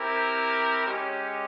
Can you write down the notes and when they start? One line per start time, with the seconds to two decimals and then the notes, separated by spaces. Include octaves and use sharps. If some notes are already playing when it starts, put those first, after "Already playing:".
Already playing: C4 E4 G4 A#4
0.84 G#3 C#4 G4